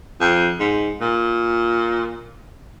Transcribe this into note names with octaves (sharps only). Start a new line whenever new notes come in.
F2
G#2
A#2